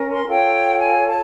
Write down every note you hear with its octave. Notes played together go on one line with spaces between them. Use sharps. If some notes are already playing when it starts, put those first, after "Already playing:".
Already playing: C#4 A#4
C6
F4 A4 C#5 G5
G#5
A5